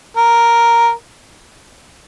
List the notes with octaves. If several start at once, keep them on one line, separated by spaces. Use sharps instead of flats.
A#4